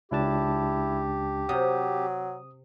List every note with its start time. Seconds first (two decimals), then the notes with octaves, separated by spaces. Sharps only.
0.12 C#2 D4 E4 G4 A5
1.49 C3 F#3 D#6